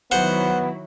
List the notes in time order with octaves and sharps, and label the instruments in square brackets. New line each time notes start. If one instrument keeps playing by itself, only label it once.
[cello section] D#3 F#3 E4 [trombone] B3 [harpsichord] C5 F#5